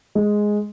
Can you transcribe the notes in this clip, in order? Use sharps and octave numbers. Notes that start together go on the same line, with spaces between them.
G#3